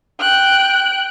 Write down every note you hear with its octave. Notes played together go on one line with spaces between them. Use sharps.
G5 F#6